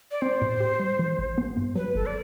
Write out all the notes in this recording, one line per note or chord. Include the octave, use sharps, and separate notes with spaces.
D5
C4 C5
A2
G4
G3
E3
A1
B3
G2
F#3 B4
G1 A4
D5